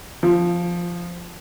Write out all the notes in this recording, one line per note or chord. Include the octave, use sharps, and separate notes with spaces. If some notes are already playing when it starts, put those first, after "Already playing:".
F3